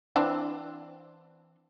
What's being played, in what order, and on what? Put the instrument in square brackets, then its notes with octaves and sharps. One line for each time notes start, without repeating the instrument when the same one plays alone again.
[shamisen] E3 C4 D4